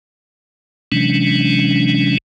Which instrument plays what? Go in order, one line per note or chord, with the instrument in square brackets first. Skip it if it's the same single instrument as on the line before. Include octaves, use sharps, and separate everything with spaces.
[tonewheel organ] C3 E3 F#3 G#3 C#4 D4